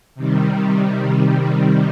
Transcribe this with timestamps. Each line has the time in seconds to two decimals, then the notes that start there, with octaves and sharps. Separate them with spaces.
0.15 C3 D#3 G3